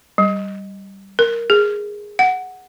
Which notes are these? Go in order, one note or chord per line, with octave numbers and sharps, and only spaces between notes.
G3
A#4
G#4
F#5